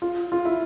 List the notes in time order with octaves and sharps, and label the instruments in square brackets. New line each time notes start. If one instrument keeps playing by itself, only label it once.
[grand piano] F4
F4
E4